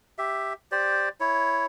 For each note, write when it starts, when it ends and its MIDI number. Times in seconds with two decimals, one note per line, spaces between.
0.18 0.53 67
0.18 0.53 76
0.72 1.09 67
0.72 1.09 72
0.72 1.09 74
1.20 1.66 64
1.20 1.66 73